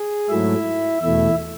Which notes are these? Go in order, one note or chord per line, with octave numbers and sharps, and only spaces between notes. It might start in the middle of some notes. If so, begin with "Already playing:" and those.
Already playing: G#4
G#2 F#3 A3 E4 E5
E2 B2 A3 E4 E5